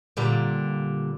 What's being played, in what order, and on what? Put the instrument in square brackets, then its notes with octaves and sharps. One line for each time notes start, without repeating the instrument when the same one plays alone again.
[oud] A#2 D3 G3